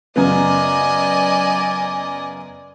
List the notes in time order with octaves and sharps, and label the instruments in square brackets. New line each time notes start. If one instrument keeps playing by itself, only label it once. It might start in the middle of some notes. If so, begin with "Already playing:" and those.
[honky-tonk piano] F#2 C#3 B3 [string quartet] D5 D#5 G#5